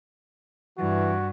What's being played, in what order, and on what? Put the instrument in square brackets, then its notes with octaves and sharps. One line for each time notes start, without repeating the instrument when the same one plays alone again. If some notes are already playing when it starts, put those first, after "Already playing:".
[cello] G2 [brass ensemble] E3 [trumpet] F#4